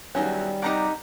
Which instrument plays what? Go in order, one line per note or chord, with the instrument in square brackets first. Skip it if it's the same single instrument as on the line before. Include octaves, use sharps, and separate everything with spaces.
[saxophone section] E2 F#3 [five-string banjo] D#3 C#4 [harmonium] G3
[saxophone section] C3 G4 F#5 [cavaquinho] D#4 A#5 D6